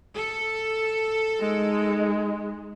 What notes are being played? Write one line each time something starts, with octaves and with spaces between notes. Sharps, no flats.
A4
G#3 D#4